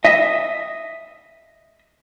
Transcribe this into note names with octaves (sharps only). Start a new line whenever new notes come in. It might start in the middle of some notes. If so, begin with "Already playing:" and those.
D#5 E5